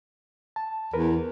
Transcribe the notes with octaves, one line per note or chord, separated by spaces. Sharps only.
A5
E2 A#4 B4